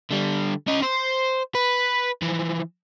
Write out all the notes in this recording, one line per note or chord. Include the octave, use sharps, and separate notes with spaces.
D3 G3
C#4 D#5
C5
B4
E3 F3